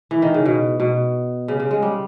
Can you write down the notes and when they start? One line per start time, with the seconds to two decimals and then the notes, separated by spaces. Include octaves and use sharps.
0.11 E3
0.22 D#3
0.34 C#3
0.46 B2
0.80 B2
1.48 C#3
1.60 C#3
1.71 G#3
1.82 G3